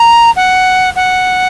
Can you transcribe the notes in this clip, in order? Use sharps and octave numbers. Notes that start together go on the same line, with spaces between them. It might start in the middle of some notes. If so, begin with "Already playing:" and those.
Already playing: A#5
F#5
F#5